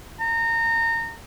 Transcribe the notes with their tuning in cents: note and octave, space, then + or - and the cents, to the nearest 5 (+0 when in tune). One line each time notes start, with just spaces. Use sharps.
A#5 -25